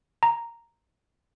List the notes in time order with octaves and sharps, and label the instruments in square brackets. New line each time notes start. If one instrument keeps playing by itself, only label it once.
[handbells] A#5